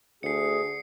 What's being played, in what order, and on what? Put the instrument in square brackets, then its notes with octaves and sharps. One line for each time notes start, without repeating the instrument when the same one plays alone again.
[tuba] D2 [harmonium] G#4 [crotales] C7 C#7